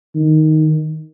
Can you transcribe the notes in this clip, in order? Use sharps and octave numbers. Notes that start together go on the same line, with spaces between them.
D#3